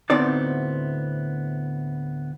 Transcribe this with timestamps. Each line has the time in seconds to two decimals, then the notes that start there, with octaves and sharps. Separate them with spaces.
0.10 D2 A2 B3 C4 D#4 D5